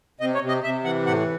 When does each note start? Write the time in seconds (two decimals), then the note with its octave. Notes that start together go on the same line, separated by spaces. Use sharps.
0.20 C3 D#5
0.35 C#5
0.42 C3
0.48 D#5
0.64 C3 E5
0.84 E3 F#5
1.06 A2 F#5